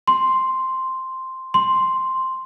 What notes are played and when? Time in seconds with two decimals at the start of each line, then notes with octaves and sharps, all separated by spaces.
0.07 C6
1.54 C6